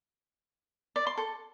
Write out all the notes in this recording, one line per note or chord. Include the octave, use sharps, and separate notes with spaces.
D5
C6
A4